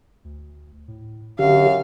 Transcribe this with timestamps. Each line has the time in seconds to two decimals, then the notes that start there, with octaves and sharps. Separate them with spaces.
0.24 D2
0.88 A2
1.39 G#1 F#2 D3 G4 F5